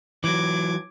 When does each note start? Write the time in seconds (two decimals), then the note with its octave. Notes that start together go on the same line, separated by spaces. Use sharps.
0.24 E3 F#3 D6 G#6